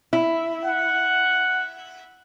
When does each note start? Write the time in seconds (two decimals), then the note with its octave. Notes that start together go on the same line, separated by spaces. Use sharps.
0.13 E4
0.65 F#5